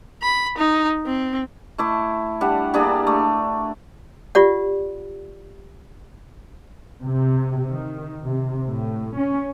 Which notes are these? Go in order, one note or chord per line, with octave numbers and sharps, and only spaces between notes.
B5
D#4
C4
A3 E4 D6
G3 D4 F#5
G3 A#3 D4 G#4
A3
F4 G4 D5 F#5
C3
D#3
C3
A2
C#4